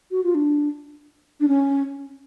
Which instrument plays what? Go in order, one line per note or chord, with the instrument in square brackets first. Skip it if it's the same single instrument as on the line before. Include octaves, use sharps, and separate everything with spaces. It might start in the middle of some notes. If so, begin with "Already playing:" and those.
[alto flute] F#4
F4
D4
D4
C#4